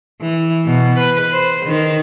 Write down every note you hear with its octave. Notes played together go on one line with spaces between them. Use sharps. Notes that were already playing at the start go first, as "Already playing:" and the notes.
E3
B2
B4
C5
D#3